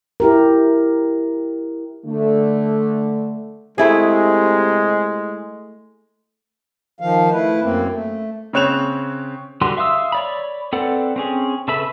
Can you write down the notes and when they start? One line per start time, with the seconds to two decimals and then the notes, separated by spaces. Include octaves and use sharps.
0.20 E4 G4 A#4
2.05 D3 A3
3.78 C3 G#3 A3 E4 G#4
7.00 D#3 F3 F5
7.32 A3 E4 B4
7.62 F#2 A#3 C4
7.90 A3
8.53 C#3 C4 C#5 F#6 E7 F7
9.61 D3 G3 F#4 B4 C6
9.77 E5 F5 C6 D#6 E6
10.12 C#5 D5 B5
10.73 C4 A4 B4 D5 F#5
11.16 C4 C#4 G#4
11.68 C#3 A4 B4 E5 B5